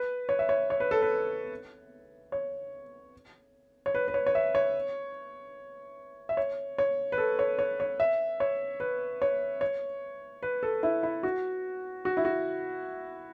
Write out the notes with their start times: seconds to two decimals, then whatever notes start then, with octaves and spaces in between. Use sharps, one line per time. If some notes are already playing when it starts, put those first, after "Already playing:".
Already playing: B4
0.29 C#5
0.39 E5
0.49 C#5
0.70 C#5
0.80 B4
0.91 A4
1.02 B4
2.32 C#5
3.86 C#5
3.94 B4
4.08 B4
4.14 C#5
4.26 C#5
4.35 E5
4.55 C#5
6.29 E5
6.37 C#5
6.78 C#5
7.12 B4
7.18 A4
7.39 C#5
7.59 C#5
7.80 C#5
8.00 E5
8.40 C#5
8.80 B4
9.22 C#5
9.61 C#5
10.43 B4
10.63 A4
10.83 E4
11.03 E4
11.23 F#4
12.05 F#4
12.17 E4
12.25 F#4